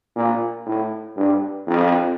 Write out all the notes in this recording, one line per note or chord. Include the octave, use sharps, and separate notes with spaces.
A#2
A2
G2
F2